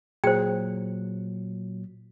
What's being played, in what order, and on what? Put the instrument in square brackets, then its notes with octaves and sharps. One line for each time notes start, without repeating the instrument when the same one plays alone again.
[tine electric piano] A#2 F#3 [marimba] G#4 [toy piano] C5 G5